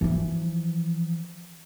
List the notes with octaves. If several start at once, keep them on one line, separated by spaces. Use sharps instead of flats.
E3 F3